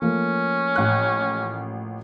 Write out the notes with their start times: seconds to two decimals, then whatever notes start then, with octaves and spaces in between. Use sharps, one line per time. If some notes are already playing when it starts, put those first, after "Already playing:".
0.02 F3 A3 A#3 C#4
0.76 A1 F#6